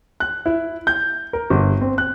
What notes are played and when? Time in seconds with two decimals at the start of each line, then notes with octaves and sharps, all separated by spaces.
0.20 F#6
0.46 E4
0.87 G6
1.33 A#4
1.50 G1
1.81 C4
1.98 F#6